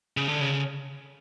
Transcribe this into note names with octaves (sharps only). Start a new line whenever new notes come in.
C#3
D3
C#3